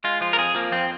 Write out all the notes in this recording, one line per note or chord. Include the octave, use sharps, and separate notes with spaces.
G#3 F4
F3 F4
A#4
F2 G#4
F3 A#3
F2 C4